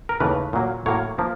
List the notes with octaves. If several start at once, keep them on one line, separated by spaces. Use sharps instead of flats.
A#4
D#2 C#3 E3 A3 B4
A#2 F#3 A#3
A2 F#3 A#3 C#5
F3 A#3